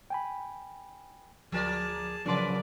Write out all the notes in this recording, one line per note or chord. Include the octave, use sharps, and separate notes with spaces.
G5 G#5 B5
D2 F3 G#4 A#4 D5 A5
C#3 F3 F#3 C#4 A#4 B4 D5 C6